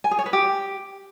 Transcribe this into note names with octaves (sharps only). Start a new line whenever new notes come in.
G#5
G#4
C#5
B4
G4